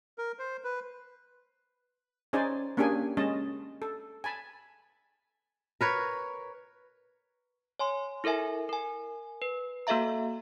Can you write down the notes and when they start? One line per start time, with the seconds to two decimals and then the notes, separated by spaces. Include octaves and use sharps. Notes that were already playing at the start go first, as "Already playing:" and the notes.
0.18 A#4
0.39 C5
0.64 B4
2.33 C#4 D#4 G#4 C5 D5 G#5
2.77 A#3 C#4 D4 G4 G#4 G#5
3.17 G#3 C#4 D#5 A5
3.82 A4
4.24 G#5 A5 B5
5.81 A#4 B4 C#5
7.79 C#5 G#5 C6
8.24 E4 A4 A#4 E5 G#5
8.69 A#4 G#5
9.42 B4
9.87 A#3 F#4 A4 E5 F5 A#5